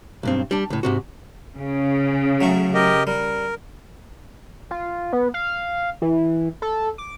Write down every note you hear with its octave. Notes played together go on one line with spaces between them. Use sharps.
B1 G2 C4
G3 D4
C#2 A2
G#2 C3 F#4
C#3
F#3 A3 C#6
G4 A#4 D#5
G3 A#4
F4
B3
F5
E3
A4
D6